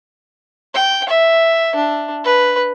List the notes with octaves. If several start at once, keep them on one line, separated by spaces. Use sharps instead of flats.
G5
E5
D4
B4